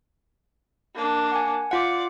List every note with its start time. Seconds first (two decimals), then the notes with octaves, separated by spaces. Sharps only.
0.95 A#3 D4
1.32 F#5 G#5
1.71 F4 D5 F5 F#5